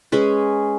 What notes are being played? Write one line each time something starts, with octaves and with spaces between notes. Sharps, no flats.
G#3 C#4 G#4 B4